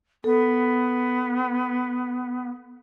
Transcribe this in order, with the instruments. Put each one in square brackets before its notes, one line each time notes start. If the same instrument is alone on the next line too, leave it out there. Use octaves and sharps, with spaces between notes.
[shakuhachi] B3 [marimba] A4